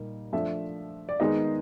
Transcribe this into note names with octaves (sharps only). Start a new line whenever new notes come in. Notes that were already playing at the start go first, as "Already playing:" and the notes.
Already playing: A#2 G3 A#3 D#4
F3 A3 D4 E5
D5
D#3 G#3 B3 D#4 D#5